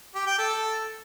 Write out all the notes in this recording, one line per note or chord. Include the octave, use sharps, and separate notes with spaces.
G4
G5
A4